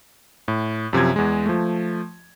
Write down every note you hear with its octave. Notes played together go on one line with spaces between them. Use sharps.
A2
F#2 C3 F3 G#6
E2 G#3
F3 A3